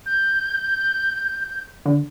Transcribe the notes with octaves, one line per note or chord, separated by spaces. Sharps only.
G6
D3